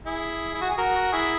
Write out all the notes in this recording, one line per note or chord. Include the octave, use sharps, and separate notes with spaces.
E4 G#4
E4
F#4
G#4
F#4 A#4
E4 G#4